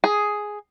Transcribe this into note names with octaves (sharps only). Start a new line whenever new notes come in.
G#4